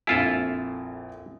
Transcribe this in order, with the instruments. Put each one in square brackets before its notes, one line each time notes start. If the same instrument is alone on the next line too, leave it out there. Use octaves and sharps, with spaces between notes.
[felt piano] A#1 F2 G#5 [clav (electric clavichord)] E4 F4 A4